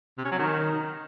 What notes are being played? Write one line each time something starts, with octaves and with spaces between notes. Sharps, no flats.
C3
C#4
F#3
D#3